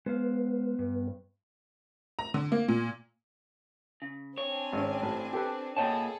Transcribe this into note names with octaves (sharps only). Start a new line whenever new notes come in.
G#3 B3 C5 F5
G2
A#5
D3
A#3
A#2
C#3
C4 D4 C#5 G#5
G#1 C#4
A1
G4 A4 B4
A#2 G#4 A4 C#5 D#5 G5 A5 A#5